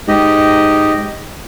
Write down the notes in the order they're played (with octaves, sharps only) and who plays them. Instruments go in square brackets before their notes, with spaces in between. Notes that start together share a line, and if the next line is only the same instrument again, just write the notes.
[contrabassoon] G#2 [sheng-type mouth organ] G4 D#5